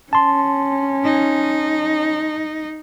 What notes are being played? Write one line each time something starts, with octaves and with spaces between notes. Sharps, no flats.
C#4 A5 C6
D#4